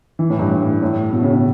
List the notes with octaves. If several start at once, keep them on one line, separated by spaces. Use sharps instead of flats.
E3
A2
G2
A2
A2
B2
C#3
C#3